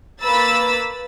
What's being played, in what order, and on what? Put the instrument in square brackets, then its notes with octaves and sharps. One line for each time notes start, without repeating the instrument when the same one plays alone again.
[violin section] A#3 B4 B5 E6 A6